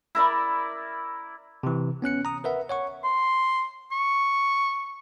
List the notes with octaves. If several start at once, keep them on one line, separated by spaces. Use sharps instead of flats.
E4 A#4 D5
C3 E3
B3 C#4 F#6 C#7
A#5 D#6
A#4 B4 E5 F#5
C#5 F#5 C#6
C6
C#6